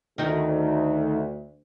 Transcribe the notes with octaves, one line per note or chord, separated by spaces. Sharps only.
D2 D#3 D#4 F#4